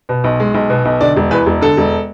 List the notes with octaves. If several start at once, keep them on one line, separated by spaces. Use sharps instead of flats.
B2
B1
G#3
B1
B2
B1
D3 D5
E1
E2 B4
E1
D3 A4
E1